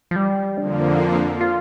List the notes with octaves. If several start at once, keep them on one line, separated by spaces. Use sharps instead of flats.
F3
G3
F2 D3 F3 A#3 D4
F4
F4